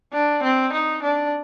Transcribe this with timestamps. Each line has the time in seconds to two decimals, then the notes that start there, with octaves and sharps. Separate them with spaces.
0.13 D4
0.43 C4
0.72 D#4
1.02 D4